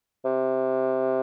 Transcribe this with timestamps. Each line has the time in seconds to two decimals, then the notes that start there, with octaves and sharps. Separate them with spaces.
0.25 C3